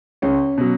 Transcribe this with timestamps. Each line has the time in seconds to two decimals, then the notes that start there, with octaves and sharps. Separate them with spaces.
0.22 C#2 C#4
0.58 B2 F#3